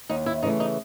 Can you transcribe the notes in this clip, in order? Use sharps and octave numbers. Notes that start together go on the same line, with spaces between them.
D#2 D#4
E4
C#3 E3 A3 D#4
D#4